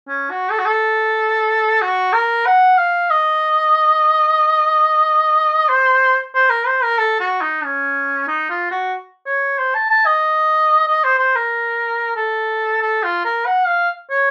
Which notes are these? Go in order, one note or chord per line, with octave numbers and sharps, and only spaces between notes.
C#4
F#4
A4
F#4
A4
F#4
A#4
F#5
F5
D#5
C5
C5
A#4
C5
A#4
A4
F#4
D#4
C#4
D#4
F4
F#4
C#5
C5
A5
A5
D#5
D#5
C5
C5
A#4
A4
A4
F4
A#4
F#5
F5
C#5